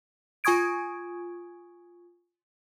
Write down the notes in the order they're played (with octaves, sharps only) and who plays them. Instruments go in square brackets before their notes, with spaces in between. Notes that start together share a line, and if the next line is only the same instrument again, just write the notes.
[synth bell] F4 G#5 C#6 D#6 G#6 D7